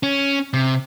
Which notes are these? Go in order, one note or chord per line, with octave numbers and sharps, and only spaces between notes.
C#4
C3